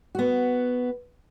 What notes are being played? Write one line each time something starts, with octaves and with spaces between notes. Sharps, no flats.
B3 F#4